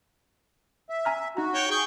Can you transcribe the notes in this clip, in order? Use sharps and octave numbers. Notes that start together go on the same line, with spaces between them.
E5
G#5 A#5 F6
D#4 F#4 A#5
C#5 G5
G#4 G5 C#6